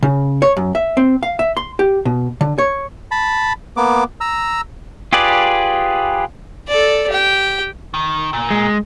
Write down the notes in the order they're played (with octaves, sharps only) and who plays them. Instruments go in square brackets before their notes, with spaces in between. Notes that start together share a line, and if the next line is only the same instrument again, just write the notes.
[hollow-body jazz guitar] C#3
C#5
F#2
E5
C4
F5
E5
C6
G4
B2
D3
C#5
[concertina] A5 B5
A#3 B3 D6
A#5 E6
[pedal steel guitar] F4 G4 G#4 B4 D5
[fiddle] A4 D5
G4 G5
[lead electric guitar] D#3
A#2
[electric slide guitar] G#3